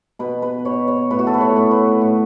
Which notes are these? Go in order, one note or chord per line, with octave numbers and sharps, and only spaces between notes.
B2 B4
B4
B2 C#5
C#5
A2 B4
F#4
A4
B4
C#5
A2
B4
A2